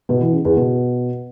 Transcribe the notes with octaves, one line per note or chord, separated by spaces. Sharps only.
B2
E3
C#3
E2
B2